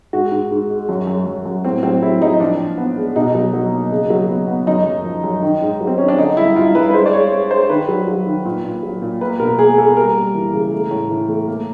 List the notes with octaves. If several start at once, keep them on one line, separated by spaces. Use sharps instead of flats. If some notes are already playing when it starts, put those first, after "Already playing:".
G#2 F#4
G#2
G#2
G#3
F#2
F#2
F#2
F#2
A2 C4
F#3 C4
F#3 E4
F#3 D#4
F3 D4
A#2
B3
G#3
B2 D#4
F#3
F#3
A#3
C#3
F#3
B3
B3
F#2 D#4
F#2
F3
F#2
D#3
G#2
F#3
C4
D#3 C#4
D4
D3 D#4
G2 E4
G2 F4
G2 B4
B4
G#3 C5
D5
G#3 C#5
G#3 C#5
G#3 C5
D#3 B4
F#3
F#3
D#3
A#2
A#2
F#3
A#2
A#3 B4
B2 A#4
A#3 G#4
A#3 A4
G3 A#4
G3
E3
C#3
A3
A2
E3
A3
A#3